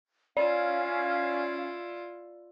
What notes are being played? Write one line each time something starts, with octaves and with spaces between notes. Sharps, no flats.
C#4 E4 F4 D5 F5